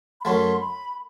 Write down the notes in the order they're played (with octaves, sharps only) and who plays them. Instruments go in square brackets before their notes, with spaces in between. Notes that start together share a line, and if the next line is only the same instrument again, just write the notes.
[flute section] B5
[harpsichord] F#2 F#3 A3 [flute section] C6
[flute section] B5